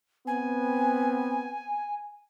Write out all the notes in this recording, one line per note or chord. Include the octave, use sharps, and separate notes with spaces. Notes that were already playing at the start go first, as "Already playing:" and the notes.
B3 C4 G#5